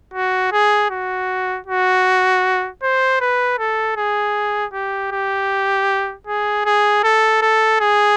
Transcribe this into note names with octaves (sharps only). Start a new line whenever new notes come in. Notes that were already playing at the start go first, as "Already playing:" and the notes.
F#4
G#4
F#4
F#4
C5
B4
A4
G#4
G4
G4
G#4
G#4
A4
A4
G#4